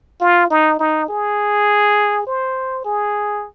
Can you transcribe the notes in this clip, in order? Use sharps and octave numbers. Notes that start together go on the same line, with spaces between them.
F4
D#4
D#4
G#4
C5
G#4